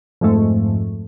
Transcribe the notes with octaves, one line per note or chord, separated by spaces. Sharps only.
F2 G#2 A3